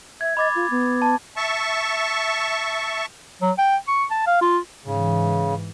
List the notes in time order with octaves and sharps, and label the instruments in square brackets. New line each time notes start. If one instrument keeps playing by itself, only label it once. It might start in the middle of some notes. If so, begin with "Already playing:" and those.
[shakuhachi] E5 [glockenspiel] G#6
[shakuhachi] D#5 [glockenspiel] B5 D6 A6
[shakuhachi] F4
B3
[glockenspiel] A5
[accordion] E5 A5 C#6
[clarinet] F#3
G5
C#6
A5
F5
F4
[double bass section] G#2 E3 [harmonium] C#3